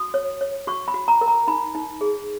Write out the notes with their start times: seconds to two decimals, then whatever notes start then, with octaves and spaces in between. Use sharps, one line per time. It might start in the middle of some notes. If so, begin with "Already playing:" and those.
Already playing: F#4 D#6
0.14 C#5
0.41 C#5
0.67 F#4 C#6
0.88 B5
0.94 F#4
1.08 A#5
1.21 A#4
1.28 A#5
1.47 D#4 B5
1.75 D#4
2.01 G#4